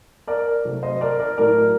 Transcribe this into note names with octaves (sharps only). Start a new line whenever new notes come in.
A#4 D5
C3 F#3 A3
C5 D#5
A#4 D5
A#4 D5
A2 F#3 A3 A#4 D5